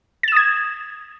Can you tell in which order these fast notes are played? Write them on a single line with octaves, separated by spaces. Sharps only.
A6 E7 D#6 G#6